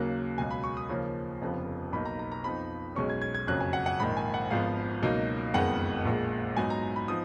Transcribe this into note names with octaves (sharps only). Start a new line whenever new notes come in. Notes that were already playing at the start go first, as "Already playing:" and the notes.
Already playing: D#2 C#3 F#3 A#3 F#6
C#2 B2 F#3 G#5
B5
C#6
D#6
D#2 C#3 F3 A#3 C#4
F1 F2 C#3 F3 B3
B1 B2 A#3 D#4 B5
A#5
A#5
A#5
F2 F3 B3 D#4 B5
B1 B2 G#3 C#4 C#6
G#6
G#6
G#6
F#1 F2 C#3 F#3 C#4 F#6
G#5
F#5
F#5
A#1 G#2 D#3 B5
G#5
F#5
G#1 G#2 F3 B3 F5
C#2 B2 F#3 A#3 D#4
F#1 F2 D#3 G#3 B3 F#5
A#1 A#2 G#3
G#2 F#3 B3 D#4 G#5
A#5
A#5
B5
F3 B3 D#4 D#6